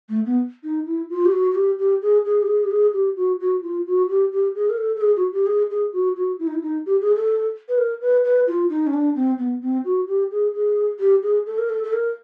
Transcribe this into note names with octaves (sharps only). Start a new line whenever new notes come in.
A3
B3
D#4
E4
F4
G4
F#4
F#4
G4
G4
G#4
G#4
G4
G#4
G4
G#4
G4
F#4
F#4
F4
F#4
G4
G4
G#4
A#4
A4
A4
G#4
F#4
G4
G#4
G#4
F#4
F#4
E4
D#4
E4
D#4
G4
G#4
A4
B4
A#4
B4
B4
F4
D#4
C#4
D4
C4
B3
C4
F#4
G4
G#4
G#4
G4
G#4
A4
A#4
A4
A4
A#4